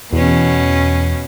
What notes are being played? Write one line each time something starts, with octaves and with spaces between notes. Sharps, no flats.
E2 B2 C#4